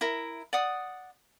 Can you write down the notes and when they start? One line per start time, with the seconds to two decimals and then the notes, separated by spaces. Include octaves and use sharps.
0.01 E4 A#4
0.53 D5 F#5 D#6